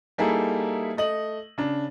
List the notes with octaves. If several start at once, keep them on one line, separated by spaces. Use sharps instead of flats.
G3 A#3 D#4 E4 G#4 A4
A3 D#5 F#7
C#3 D4